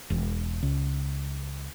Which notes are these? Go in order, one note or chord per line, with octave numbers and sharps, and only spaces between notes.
E1
C#2